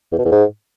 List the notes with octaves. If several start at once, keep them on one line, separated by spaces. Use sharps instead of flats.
E2
B2
E2
G#2